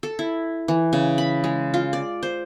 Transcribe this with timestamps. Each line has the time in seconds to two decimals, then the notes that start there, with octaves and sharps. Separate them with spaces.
0.03 A4
0.19 E4
0.68 E3
0.93 C#3
1.18 B5
1.44 G#3
1.74 F4
1.93 D5
2.23 C5